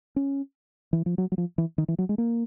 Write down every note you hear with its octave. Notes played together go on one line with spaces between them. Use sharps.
C#4
E3
F3
F#3
F#3
F3
E3
D#3
E3
F#3
G#3
A#3